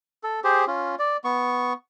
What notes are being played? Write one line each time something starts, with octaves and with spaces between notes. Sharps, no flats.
A4
G4 G#4 C5
C#4 F4
D5
B3 C#6